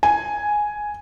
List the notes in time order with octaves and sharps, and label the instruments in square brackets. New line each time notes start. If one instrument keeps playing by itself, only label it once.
[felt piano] G#5